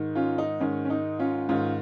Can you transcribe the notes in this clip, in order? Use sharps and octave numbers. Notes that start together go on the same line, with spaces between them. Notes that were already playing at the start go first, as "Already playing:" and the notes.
Already playing: G#2 D#3
C#4 F4
D#4
G#2 D#3 C#4
C#4
D#4
C#4 F4
G#2 D#3 C#4 F4